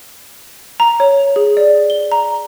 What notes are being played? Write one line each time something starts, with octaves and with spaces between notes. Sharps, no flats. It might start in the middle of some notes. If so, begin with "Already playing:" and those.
A#5
C#5
G#4
D5
G7
A#5